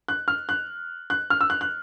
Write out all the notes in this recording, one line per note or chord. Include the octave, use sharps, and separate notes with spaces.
F#6
F6
F#6
F#6
F6
E6
F#6
F#6